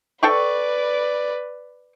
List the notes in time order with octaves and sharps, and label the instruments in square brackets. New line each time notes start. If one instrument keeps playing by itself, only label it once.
[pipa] A4 G5 C#6 [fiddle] B4 D5